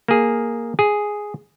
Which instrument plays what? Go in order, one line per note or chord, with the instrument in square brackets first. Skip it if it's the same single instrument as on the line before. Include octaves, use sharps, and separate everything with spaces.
[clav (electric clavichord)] A#3 G#4
G#4